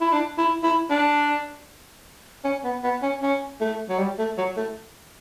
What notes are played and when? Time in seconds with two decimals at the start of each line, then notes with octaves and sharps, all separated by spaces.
0.01 E4
0.12 D4
0.38 E4
0.63 E4
0.90 D4
2.44 C#4
2.64 B3
2.83 B3
3.02 C#4
3.22 C#4
3.61 A3
3.89 F#3
3.99 G3
4.19 A3
4.38 F#3
4.57 A3